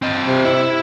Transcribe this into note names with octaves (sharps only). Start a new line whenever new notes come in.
C4 D#5
C3
E4